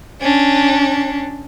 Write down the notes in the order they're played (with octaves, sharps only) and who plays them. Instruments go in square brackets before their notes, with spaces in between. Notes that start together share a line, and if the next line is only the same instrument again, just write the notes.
[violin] C#4 D4